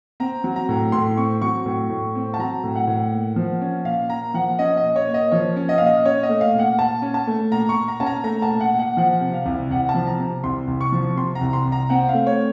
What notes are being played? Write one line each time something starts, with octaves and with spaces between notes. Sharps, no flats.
C4 A#5
F#3
A#5
A2
A2 C6
C4 C#6
F#3 C#6
A2
A2
C4
A5
F#3 A#5
A2
F#5
A2
A#3
F3
C#4
A#2 F5
A#3 A#5
F3 F#5
C#4 D#5
D#5
A#2
C#5
A#3
D#5
F3 C#5
C#4
D#5
A#2 F5
D#5
C#4 C#5
D#5
A3
F5
A#2 F#5
A#2 A5
C#4
A5
A3
A#2 A#5
C#6
A#2
A#5
C#4 A5
A#5
A3 A#5
A5
A#2
F#5
A#2
F#5
F3 F#5
C3
F5
C2
C2 F#5
A5
F3
A#5
C3
C2 C6
C2
C#6
F3
C3 C6
A#5
C2
C6
C2
A#5
C4 F#5
F5
A3
C#5